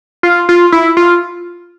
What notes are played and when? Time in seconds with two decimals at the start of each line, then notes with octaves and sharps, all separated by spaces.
0.23 F4
0.49 F4
0.72 E4
0.97 F4